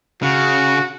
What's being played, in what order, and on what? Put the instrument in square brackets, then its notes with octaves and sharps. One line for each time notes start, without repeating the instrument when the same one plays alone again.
[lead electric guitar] C#3 [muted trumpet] F#4